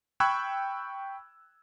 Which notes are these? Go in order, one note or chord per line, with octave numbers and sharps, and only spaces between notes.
G5 B5 C#6 E6 F#6 G#6